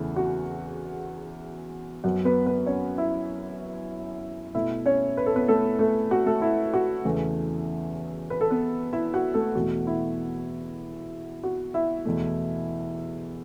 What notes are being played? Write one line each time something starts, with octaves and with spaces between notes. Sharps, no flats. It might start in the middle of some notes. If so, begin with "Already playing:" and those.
Already playing: E2 C#3 E3 A3
F#4
F#2 F#3 B3 F#4 F#5
B3 B4
B3 B4
C#4 C#5
E4 E5
B2 A3 E4 E5
C#4 C#5
B4
A4
B3 B4
A3 A4
A3 A4
F#4
A3 A4
E4
F#4
E2 C#3 E3 A3
B4
A4
B3 B4
E4 E5
F#4 F#5
A3 A4
E2 B2 A3 F#4
E4
F#4
E4 E5
E2 B2 A3